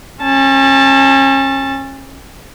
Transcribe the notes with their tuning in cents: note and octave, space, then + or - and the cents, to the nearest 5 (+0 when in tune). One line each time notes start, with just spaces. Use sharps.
C#4 -35 A5 +0